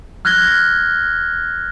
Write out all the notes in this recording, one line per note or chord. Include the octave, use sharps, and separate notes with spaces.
F6 F#6 G#6 A#6 G7